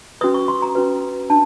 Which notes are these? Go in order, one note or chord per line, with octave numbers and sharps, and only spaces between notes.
C#4 F#4 B4 D#6
C#6
C6
A#5
C#4 F#4 B4
D4 A5